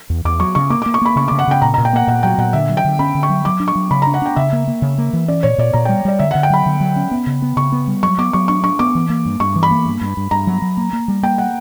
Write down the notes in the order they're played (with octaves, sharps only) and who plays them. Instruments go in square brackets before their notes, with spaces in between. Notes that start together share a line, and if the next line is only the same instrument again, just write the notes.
[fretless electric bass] E2
[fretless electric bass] E2 [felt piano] D6
[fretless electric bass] F#3 [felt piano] C#6
[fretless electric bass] C#3 [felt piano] C#6
[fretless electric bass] A#3 [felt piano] D6
[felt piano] D6
[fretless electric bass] A#3
[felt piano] C#6
[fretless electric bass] A#3 [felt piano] B5
[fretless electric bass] C#3 [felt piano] C#6
[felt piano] D6
[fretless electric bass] C#3
[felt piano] F#5
[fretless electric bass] C#3 [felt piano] G5
[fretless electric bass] A#2 [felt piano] A#5
[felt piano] A#5
[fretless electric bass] A#2
[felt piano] G5
[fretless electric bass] A#3 [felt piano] F#5
[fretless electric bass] A#2 [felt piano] F#5
[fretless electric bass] F#3 [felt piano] G5
[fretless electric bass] A#2 [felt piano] F#5
[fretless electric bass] D3 [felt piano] E5
[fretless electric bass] F#3
[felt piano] G5
[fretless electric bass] D3
[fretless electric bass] C#4 [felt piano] B5
[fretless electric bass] D3
[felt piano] C#6
[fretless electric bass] F#3
[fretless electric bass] F#3 [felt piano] D6
[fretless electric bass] D4
[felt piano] C#6
[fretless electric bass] F#3
[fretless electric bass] C#3 [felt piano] B5
[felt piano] A#5
[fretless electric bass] D4
[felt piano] F#5
[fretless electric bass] D4 [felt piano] G5
[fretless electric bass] C#3 [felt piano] E5
[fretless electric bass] A#3
A#3
C#3
A#3
E3
[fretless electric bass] C#4 [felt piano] D5
[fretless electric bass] A#2 [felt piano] C#5
[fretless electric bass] A#2 [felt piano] D5
[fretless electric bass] A#2 [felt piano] A#5
[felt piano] G5
[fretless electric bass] G3
[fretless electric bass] G3 [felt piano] D5
[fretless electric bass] D3 [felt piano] E5
[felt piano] F#5
[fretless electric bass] D3
[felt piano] G5
[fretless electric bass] F#3 [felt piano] B5
[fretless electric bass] D3
F#3
C#4
B3
C#3
B3
[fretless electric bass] C#3 [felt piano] C#6
[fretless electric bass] B3
G3
[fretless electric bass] F#3 [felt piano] C#6
[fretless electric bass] B3 [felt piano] D6
[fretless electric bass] F#3 [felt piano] C#6
[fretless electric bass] D4 [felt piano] C#6
[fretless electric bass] D4 [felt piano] C#6
[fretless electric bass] B3 [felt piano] D6
[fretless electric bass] E3
A#3
G2
[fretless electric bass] G2 [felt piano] C#6
[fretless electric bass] E3
[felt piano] B5
[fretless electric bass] A#3
G2
G2
G2
[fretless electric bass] G2 [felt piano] A#5
[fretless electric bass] F#3
F#3
A#3
A#3
G3
[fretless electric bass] A#3 [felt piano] G5
[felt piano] F#5